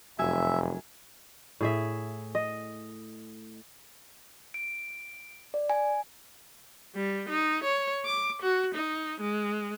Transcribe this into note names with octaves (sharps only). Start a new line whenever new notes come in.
F1 F#2 E5 G#5 E6
A2 G#4 E5
D#5
D7
D5
G#5
G3
D#4
C#5
D6
F#4
D#4
G#3